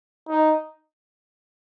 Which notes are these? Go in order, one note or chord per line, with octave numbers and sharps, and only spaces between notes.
D#4